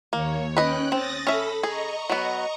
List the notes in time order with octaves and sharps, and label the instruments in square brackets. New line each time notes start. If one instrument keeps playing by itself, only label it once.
[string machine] D#2 C#5 [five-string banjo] A#3
[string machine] C#4 G5 F#6 [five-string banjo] B4 D#5
[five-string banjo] C4 [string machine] D#6 A6 A#6
[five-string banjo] C#4 E5 [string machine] A4 B5
[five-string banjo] G#4 [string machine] D#5 A#5 C#6
[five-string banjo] F#3 B3